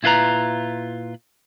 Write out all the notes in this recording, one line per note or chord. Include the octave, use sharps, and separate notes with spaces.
A#2 E4 F4 B4 A#5